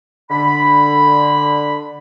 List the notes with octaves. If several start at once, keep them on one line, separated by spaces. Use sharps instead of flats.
D3 B5